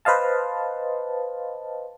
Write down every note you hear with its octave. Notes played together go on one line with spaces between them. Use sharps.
B4 C5 D#5 F5 A5